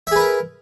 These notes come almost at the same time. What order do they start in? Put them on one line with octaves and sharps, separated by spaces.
E5 G#4 B4 A#4